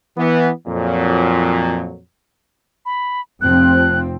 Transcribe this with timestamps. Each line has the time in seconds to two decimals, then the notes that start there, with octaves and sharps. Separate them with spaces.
0.17 E3 B3
0.67 F2 A#2 F#3
2.86 B5
3.41 F1 F3 C4 F#6